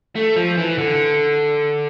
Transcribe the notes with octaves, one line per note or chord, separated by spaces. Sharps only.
A3
F3
E3
D3